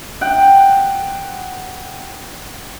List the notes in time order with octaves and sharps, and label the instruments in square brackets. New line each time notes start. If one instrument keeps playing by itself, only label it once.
[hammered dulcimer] F#5 G5